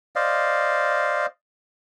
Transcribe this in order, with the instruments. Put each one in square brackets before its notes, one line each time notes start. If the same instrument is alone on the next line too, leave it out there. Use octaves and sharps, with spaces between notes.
[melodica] C5 D5 D#5 F5